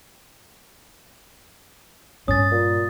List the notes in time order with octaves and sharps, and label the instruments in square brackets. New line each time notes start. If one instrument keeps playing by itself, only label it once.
[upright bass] G2 [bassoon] C#4 [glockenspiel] D#6 A6
[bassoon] A#2